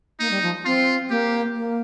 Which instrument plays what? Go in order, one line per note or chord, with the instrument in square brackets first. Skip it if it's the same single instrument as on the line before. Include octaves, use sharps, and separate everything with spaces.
[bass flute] A#3 [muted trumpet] D#4
[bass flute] G3
F3
[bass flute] C4 [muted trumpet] F4
[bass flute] A#3 [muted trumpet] G4
[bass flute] A#3